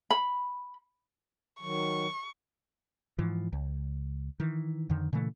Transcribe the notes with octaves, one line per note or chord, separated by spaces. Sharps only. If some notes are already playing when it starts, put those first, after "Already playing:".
B5
D#3 F#3 C#6
G#2 E3 F3
C#2
D#3 E3
F2 D3 D#3
A#2 C#3 E3 A3